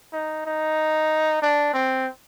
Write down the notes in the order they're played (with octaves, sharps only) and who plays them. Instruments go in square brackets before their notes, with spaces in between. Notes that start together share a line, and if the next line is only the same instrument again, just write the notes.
[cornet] D#4
D#4
D4
C4